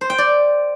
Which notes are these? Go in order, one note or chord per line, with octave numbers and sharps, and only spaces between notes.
C5
G5
D5